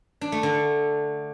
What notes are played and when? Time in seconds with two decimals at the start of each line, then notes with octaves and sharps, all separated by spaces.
0.21 D4
0.32 A3
0.43 D3